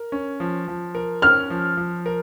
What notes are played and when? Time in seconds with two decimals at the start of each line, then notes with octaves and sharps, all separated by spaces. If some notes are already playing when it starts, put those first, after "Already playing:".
Already playing: A#4
0.12 C#4
0.40 F3
0.68 F3
0.95 A#4
1.22 C#4 F6
1.50 F3
1.77 F3
2.06 A#4